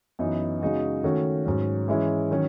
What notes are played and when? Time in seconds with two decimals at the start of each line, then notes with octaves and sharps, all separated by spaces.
0.19 F#2 E3 B3 D#4
0.62 C#3 G#3 D#4 F#4
1.04 D#3 A3 C#4 F#4
1.46 G#2 F#3 C#4
1.88 E3 G#3 C#4 E4
2.31 D#3 F#3 C#4